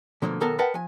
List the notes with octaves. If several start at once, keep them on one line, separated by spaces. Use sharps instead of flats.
B2 D3 F3 A3 A#3
B1 D#3 B3 A4 A#4 A5
A#4 B4 D#5 F#5 G5 A5
F3 G#5